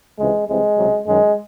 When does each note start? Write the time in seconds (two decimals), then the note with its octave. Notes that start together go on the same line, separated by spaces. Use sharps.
0.18 C#2 C3 E3 G#3
0.48 C2 C3 E3 G#3
0.77 C#2 C3 F#3
1.07 F#2 D#3 F#3 G#3